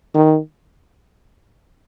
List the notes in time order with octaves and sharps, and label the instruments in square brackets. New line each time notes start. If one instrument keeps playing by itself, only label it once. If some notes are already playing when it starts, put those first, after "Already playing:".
[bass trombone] D#3